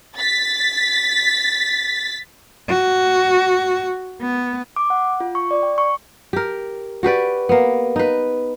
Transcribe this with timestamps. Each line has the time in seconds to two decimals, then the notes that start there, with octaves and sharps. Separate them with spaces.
0.16 A6 B6
2.69 F#4
4.21 B3
4.76 D6
4.90 F#5
5.20 F4
5.35 C#6
5.51 D5
5.63 G5
5.78 C#6
6.33 G4 A#4
7.03 F#4 G4 B4 D5
7.49 A#3 B3
7.96 D#4 B4